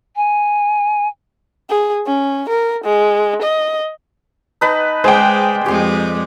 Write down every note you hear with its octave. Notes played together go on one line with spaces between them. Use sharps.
G#5
G#4
C#4
A#4
G#3
D#5
D#4 B4 A5
G#3 G#4 C5 D5 G5
F2 G#3 G4 C6